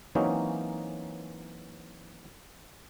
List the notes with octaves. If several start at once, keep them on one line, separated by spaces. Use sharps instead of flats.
E3 F#3 A#3 C4 C#4 D#4